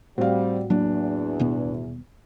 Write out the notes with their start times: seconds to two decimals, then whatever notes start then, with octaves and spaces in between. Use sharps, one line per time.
0.18 A2 G3 C4 F#4 F5
0.70 E2 F#3 A#3 D4
1.39 D#1 B2 B3